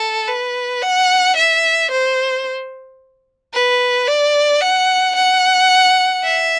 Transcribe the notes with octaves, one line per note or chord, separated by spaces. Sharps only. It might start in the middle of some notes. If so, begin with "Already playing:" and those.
Already playing: A4
B4
F#5
E5
C5
B4
D5
F#5
F#5
E5